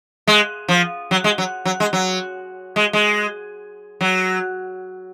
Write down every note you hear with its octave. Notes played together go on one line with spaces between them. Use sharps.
G#3
F3
F#3
G#3
F#3
F#3
G#3
F#3
G#3
G#3
F#3